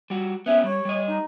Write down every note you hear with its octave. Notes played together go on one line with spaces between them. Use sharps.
G3 F#4
B3 C#4 G4 E5
G3 C#5
G3 D#5
D#4